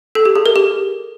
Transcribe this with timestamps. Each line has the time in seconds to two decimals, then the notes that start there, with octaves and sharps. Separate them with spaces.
0.15 A4
0.25 G4
0.35 G#4
0.46 A#4
0.56 G4